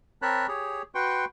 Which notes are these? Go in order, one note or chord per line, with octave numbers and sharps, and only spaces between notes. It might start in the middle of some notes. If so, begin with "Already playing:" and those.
C4 A#4 C#5 A5 B5 F#6
G4 G#4 C#5
F#4 B4 G5 C6 C#6